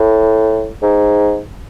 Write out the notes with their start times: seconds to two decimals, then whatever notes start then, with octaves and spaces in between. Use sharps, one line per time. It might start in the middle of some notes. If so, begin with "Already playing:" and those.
Already playing: A2
0.82 G#2